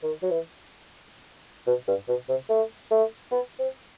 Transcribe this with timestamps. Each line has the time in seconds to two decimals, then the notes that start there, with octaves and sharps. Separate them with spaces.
0.03 D#3
0.23 F#3
0.31 E3
1.67 B2
1.88 G2
2.08 B2
2.29 C3
2.49 A3
2.91 A3
3.32 B3
3.59 C4